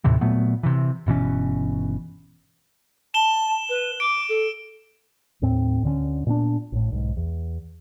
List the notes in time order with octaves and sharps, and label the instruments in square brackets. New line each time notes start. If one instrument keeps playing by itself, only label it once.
[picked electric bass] D#2 A2 C3 E3
A#2 F#3 A3 B3
C3 E3
G1 B2 E3 C#4
[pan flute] A5 [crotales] E7 G7
[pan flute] B4
[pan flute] D6 [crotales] D7
[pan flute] A4
[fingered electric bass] D#2 A2 C4
D2 D3 F#3 C#4
A#2 B3 C4 D4
A1 A2
B1 G#2
E2